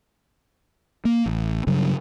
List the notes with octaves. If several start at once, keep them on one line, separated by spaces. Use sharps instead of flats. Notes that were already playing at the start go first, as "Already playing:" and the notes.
A#3
A1
G2 C#3 F#3